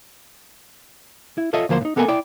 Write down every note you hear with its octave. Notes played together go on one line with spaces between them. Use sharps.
E4
F4 A4 C#5 D#5 E5
D2 F3 A#3 C5 C6
A2 D#4
A#3 B3 A4 A#4 G#5
E4 D5 G5